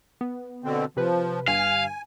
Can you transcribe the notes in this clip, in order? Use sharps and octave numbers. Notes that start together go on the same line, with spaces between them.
B3
B2 D3 C4
C3 F3 B4
G1 G2 F5 G#5